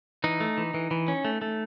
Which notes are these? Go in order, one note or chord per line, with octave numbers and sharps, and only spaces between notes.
E3 D#4
A3
E3
E3
E3
C#4
A3
A3